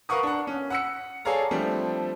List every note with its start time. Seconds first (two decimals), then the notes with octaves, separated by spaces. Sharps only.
0.09 A#4 B4 F5 F#5 C#6 D#6
0.23 D4 F#5
0.47 C#4
0.70 F#5 E6 C#7
1.25 G#4 A4 C#5 D5 F5 A#5
1.51 F3 G3 A3 C4 D4